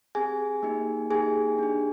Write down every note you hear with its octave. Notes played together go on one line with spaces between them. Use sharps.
C4 G4 G#4 G#5
A#3 D#4 G4
A#3 D#4 G4 G#4 G#5
D4 G4